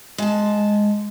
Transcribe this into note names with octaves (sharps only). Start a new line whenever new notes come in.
G#3 A5